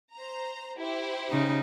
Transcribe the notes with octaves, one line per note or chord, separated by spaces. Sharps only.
C5 A#5
E4 G4 C5
C#3 D#4